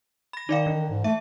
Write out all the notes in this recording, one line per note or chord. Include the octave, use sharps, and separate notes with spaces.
B5 A#6
D#3 D#4 D5 F5
E3
G#2
A3 E5